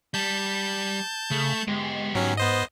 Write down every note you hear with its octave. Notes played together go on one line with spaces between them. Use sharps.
G3 A5 G6
C#3 A3
G#3 B3 G4
G#2 F#3 C#4
B3 C5 D#5